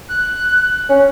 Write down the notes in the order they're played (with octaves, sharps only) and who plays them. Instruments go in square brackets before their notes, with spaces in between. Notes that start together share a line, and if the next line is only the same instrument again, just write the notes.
[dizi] F#6
[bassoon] C#4